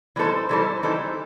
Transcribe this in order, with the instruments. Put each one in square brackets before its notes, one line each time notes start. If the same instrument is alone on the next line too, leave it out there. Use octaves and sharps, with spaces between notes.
[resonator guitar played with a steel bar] E3 G3 D#4 A4 C5
E3 G3 D#4 A4 C5
E3 G3 D#4 A4 C5